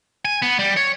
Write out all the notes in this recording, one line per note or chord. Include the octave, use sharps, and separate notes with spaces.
G#5
B3
G3
C#5